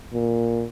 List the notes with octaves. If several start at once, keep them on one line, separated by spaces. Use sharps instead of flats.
A#2